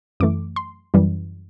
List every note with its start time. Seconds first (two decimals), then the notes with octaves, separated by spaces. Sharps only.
0.20 F#2 E3 A3 D6
0.56 C6
0.94 F#2 E3 G3